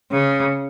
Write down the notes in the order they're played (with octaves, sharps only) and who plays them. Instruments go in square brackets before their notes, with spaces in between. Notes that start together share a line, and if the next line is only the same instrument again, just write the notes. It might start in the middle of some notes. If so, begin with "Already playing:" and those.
[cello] C#3